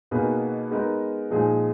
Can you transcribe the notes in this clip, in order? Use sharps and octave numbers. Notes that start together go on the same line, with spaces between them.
B2 A#3 D#4 G#4 B4
G#3 B3 D#4 A#4
A#2 F3 G#3 D#4 G#4